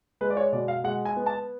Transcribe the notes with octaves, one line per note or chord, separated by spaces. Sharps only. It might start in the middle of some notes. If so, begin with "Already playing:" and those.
G#3 B4
D5
C#5
B2 D5
F5
G#3 F#5
G#5
B3
A5